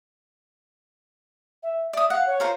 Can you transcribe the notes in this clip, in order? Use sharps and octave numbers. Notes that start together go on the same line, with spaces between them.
E5
D5 E5 D#6
F5 F#5
C#5
F4 A#4 C5